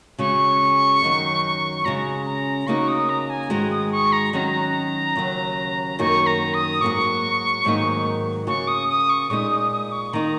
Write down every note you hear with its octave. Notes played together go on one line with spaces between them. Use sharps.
C#3 G#3 F#4 C#6
F#2 D#3 F#3 D#4
C#3 G#3 C#4 F#4 A#5
A#5
C#3 A#3 D#4 F#4 C#6
D#6
A#5
G#5
G#2 D#3 G#3 F#4 A#5
D#6
C#6
A#5
D#3 F#3 C#4 F#4 A#5
D#2 C#3 F#3
F#2 D#3 A#3 D#4 F#4 C#6
A#5
D#6
G#2 F#3 A#3 F#4 C#6
G#2 D#3 F#3 A#3 D#4
C#3 A#3 F#4 C#6
D#6
D#6
C#6
A#2 G#3 D#4 D#6
D#6
D#6
C#6
D#3 A#3 D#4 A#5